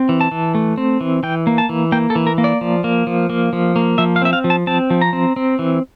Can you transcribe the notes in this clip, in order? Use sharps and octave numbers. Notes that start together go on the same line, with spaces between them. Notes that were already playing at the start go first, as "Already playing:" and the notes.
Already playing: C4
E3
A5
E3
A3
C4
E3
E3 G5
A#3
A5
E3
A#3 G5
A4
E3
A#4
A#3
D5
F3
A#3
F3
A#3
F3
A#3
F3 E5
F5
C4 E5
F5
F3
A5
C4 A5
F3
A#5
C4
C4
E3